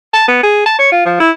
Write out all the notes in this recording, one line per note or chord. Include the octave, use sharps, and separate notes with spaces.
A5
B3
G#4
A5
C#5
F4
F3
E4